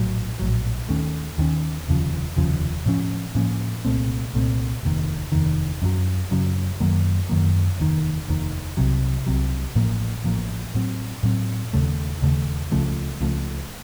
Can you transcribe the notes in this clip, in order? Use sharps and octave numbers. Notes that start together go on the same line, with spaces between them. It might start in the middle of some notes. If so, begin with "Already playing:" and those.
Already playing: A#1 A2 F#3
A#1 A2 F#3
D#2 D#3 A3 C#4
D#2 D#3 A3 C#4
F1 D#2 C#3 F3
F1 D#2 C#3 F3
A2 F3 A#3 C#4
A2 F3 A#3 C#4
C2 A#2 A3 C4
C2 A#2 A3 C4
F1 D#2 D#3
F1 D#2 D#3
F#2 C#3 F#3
F#2 C#3 F#3
F#2 D#3 F#3 A#3
F#2 D#3 F#3 A#3
F1 D#2 D#3
F1 D#2 D#3
C2 C3 F#3
C2 C3 F#3
A1 A2 F3 A#3
A1 A2 F3 A#3
A2 F#3 C4
A2 F#3 C4
D#2 C#3 A3
D#2 C#3 A3
C#2 C#3 F3 A3
C#2 C#3 F3 A3